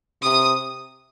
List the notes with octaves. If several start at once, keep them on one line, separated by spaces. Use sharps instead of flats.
C3 D#6